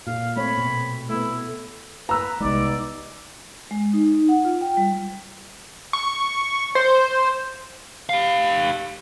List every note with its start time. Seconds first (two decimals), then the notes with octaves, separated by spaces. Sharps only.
0.07 A#2 F5
0.36 A3 C4 C#5 B5
0.58 B2
1.10 A3 B3 E4
2.09 B4 A#5 E6
2.40 C2 G3 G#3 B3 D#4 D5
3.71 G#3
3.93 D#4
4.29 F#5
4.45 F4
4.61 G5
4.77 G3
5.93 C#6
6.75 C5
8.09 G4 F5